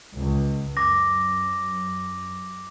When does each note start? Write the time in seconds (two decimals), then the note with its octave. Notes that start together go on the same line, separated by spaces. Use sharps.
0.17 C#2
0.77 F#2 D6 A#6